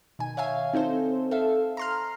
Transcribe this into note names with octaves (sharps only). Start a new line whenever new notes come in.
B2 D#3 G#5
C#5 E5 F5 G#5
C4 D#4 A4 C5
A4 E5 F5
A#5 C6 F6